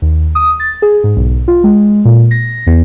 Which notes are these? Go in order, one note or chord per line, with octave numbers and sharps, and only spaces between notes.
D#2
D#6
A6
G#4
G#2
B1
F4
G#3
A#2
A#6
E2